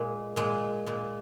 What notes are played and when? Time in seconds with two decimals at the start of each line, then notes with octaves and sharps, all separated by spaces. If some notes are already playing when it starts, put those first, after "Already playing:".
Already playing: A#2 G#3
0.36 A#2 G#3
0.86 A#2 G#3